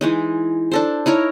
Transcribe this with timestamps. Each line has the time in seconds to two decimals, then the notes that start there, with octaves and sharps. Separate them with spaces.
0.01 E3 G#3 D#4
0.72 D4 A4 C5
1.06 D#4 E4 A#4 C#5